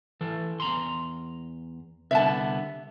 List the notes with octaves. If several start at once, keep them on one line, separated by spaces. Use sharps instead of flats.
E3 A4
E2 A#5 C6
C2 D3 B3 E5 A5